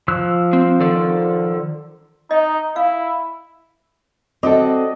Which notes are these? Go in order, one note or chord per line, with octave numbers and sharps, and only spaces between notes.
F3 E6 F#6
C4
D#3 A4 D5
D#4 D#5
E4 F5
C4 F#4 A4 D5 D#5